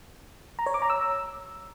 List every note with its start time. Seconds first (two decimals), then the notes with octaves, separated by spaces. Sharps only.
0.59 A#5
0.66 C#5
0.74 D6
0.82 A#5
0.90 E6